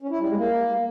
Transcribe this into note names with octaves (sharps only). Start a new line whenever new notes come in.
C#4
E4
G3
G#3
A#3